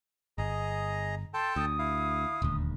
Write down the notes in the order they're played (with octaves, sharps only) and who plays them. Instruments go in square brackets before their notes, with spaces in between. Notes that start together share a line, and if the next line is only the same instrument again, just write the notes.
[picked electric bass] G1 [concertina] G#4 D#5 A#5
[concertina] A4 G5 A5 [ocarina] C6
[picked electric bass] D2 [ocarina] D#6
[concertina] E4 F5
[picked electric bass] D#1 D2